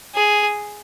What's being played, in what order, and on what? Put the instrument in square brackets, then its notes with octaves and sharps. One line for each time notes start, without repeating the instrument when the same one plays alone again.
[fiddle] G#4